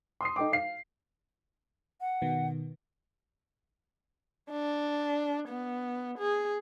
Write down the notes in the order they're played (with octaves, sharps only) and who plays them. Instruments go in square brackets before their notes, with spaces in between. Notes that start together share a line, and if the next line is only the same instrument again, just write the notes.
[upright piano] C6 D#6 C7
D#4 A4 G5 D6
F5 C7
[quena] F#5
[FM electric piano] B2 D#3 B3
[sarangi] D4
B3
G#4